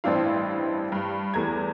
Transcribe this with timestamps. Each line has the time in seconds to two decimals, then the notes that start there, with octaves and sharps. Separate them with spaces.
0.04 A1 G2 C4 D4 E4 F5
0.92 G2
1.34 E2 A3 A#5 G#6